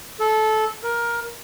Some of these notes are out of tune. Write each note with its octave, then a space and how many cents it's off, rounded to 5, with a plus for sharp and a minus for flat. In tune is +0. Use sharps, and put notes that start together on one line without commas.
A4 -20
A#4 +15